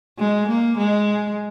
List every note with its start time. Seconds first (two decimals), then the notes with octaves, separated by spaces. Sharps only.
0.19 G#3
0.48 A#3
0.78 G#3